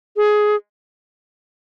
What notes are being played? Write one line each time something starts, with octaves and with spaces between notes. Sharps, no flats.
G#4